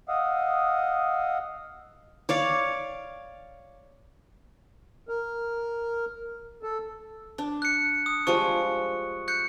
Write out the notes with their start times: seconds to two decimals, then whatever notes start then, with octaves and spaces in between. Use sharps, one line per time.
0.08 D#5 F5 F#5 D#6 E6
2.29 C#5 D5 F5
5.09 A#4
6.63 A4
7.38 D4
7.62 F#6 C#7
8.06 D#6
8.27 F3 G3 G#3 C#6
9.28 F#6 G6 C#7